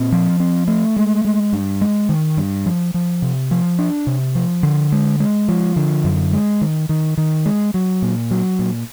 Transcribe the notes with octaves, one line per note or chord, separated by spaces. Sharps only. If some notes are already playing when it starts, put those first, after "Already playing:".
Already playing: A#2 C4
F3
C4
A3
G#3
G#3
G2
G#3
D#3
G2
F3
F3
C3
F3
D4
C3
F3
D3
G#3
G#3
F3
D3
F#2
G#3
D#3
D#3
D#3
G#3
F#3
A#2
F#3
A#2